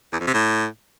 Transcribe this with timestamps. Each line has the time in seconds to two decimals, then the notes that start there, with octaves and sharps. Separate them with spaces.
0.13 E2
0.20 F2
0.27 C3
0.34 A2